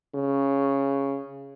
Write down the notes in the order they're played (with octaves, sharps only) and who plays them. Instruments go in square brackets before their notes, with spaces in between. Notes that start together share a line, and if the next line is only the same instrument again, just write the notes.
[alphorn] C#3